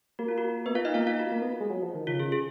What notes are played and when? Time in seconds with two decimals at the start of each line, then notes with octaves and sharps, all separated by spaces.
0.19 A#3 F#4
0.28 F4
0.38 F#4
0.66 B3 B4
0.75 F4 F5
0.85 D#4 D#5
0.94 A#3 F4 F5
1.07 F4 F5
1.19 F#4
1.31 A#3
1.42 B3
1.60 G#3
1.70 F#3
1.82 F3
1.94 D#3
2.07 C#3 F4
2.20 G#4
2.32 G#4